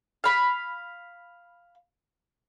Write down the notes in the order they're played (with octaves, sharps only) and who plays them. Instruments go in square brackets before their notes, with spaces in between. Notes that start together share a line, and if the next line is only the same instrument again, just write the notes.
[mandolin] F5 B5